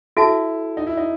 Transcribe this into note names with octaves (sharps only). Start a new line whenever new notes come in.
E4 F#4 A4 E5 A5
D#4
E4
D#4